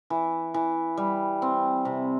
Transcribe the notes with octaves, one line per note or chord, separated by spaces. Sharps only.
E3
E3
G3
C4
C3